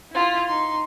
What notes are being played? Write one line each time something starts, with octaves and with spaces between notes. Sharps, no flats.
E4 F4
D#4 C6